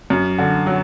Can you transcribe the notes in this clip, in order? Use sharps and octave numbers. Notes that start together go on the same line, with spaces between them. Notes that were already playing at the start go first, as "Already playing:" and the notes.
F#2
D3
F#3